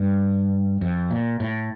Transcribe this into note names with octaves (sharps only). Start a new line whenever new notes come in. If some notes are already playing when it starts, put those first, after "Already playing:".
Already playing: G2
F2
A#2
A2